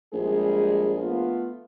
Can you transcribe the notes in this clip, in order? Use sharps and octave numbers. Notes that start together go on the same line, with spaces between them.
A#1 G3 G#3 G#4
A3 B3 F4